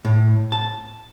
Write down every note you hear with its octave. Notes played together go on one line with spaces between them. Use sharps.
A2
A5